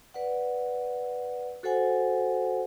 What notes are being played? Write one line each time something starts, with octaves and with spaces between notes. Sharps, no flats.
B4 D5 F#5
F#4 A4 C5 F#5 G#5